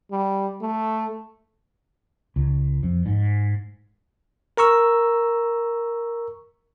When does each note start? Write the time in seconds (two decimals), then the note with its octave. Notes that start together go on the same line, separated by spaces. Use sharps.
0.11 G3
0.61 A3
2.36 C#2
2.83 F2
3.06 G#2
4.57 A#4 A#5 C#6 E6